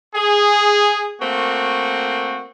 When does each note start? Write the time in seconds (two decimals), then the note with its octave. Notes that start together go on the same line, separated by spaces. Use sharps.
0.15 G#4
1.21 A3 A#3 C4 F#4